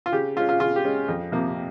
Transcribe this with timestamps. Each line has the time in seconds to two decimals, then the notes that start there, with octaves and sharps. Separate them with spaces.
0.06 F4
0.12 C#3 G4
0.36 G#3 F4
0.40 C#4
0.49 F4
0.60 C#3 F4
0.76 G4
0.85 G#3 C#4
1.08 F2
1.32 C3 F3 A#3